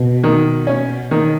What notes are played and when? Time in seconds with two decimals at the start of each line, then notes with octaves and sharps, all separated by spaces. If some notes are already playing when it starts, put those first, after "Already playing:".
Already playing: B2
0.24 D#3
0.67 C#4
1.11 D#3